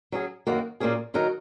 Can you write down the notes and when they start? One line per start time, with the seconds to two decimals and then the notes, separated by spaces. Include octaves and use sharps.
0.12 F#3 C#4 G#4
0.47 F#2 D#3 A#3 F#4 A#4
0.80 A#2 A#3 C#4 G#4
1.14 D#3 F#3 D#4 F#4 A#4